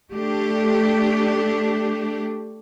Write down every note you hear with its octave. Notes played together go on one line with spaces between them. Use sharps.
A3 D4 G4